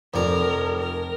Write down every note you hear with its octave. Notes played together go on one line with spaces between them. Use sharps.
F1 F2 A#4 D5
A#4